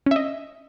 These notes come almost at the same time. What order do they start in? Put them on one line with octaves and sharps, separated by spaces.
C#4 E5 D#5